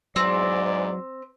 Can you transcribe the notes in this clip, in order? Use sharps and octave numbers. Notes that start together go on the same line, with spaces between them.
E2 G#2 F#3 C4 D5